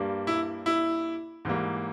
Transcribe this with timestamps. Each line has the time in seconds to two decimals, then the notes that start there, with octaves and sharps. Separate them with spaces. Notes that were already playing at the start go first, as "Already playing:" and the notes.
Already playing: G2 G3 A#3
0.27 E4
0.66 E4
1.45 G#2 E3 G3 A#3